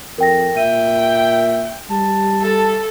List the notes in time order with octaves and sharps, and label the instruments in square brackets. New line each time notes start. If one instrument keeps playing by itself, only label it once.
[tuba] F2 [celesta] A#4 G5 A#6
[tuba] A#2 [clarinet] E5 [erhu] G5 [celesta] D#7
[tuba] G3 [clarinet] A5
[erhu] A4